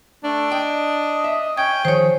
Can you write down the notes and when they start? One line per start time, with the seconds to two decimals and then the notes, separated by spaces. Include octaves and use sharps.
0.24 A3 D4
0.52 D#5 G5
1.24 E5
1.57 C#4 G5 G#6
1.85 D#3 F3 G#4 C5 C#5